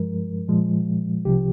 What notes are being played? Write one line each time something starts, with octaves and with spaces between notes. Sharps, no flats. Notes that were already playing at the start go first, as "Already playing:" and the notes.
Already playing: G2 F3 G#3 A#4
A#2 F3 G#3
C2 C3 F3 G4